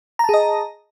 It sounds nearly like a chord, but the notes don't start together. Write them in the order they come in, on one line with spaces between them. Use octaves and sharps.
A#5 A5 G#4 D#5